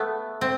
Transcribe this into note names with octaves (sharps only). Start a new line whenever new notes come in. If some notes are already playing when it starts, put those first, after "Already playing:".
Already playing: A3 B3
C4